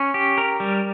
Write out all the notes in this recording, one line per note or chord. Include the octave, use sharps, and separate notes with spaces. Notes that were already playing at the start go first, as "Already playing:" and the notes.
Already playing: C#4
G4
A#4
G3